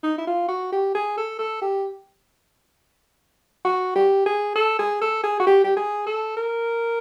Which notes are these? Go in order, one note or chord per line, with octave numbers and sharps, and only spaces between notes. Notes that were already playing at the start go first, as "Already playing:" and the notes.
D#4
E4
F4
F#4
G4
G#4
A4
A4
G4
F#4
G4
G#4
A4
G#4
A4
G#4
F#4
G4
G4
G#4
A4
A#4